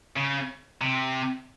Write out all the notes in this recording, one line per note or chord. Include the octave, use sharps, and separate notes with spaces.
C#3
C3